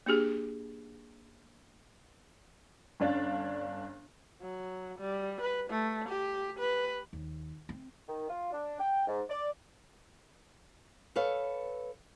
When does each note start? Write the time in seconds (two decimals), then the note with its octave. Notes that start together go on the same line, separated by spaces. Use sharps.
0.06 A#3 D4 G4 G#4
3.00 G1 C#4 D4 F5 A6
4.42 F#3
4.99 G3
5.41 B4
5.70 A3
6.09 G4
6.59 B4
7.13 D#2
7.69 C4
8.08 D#3
8.29 F4
8.52 D4
8.79 G5
9.07 G#2
9.30 D5
11.16 A4 B4 C#5 F5